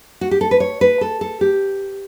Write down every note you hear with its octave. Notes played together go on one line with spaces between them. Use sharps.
F#4
G4
A4
B4
C#5
B4
A4
A4
G4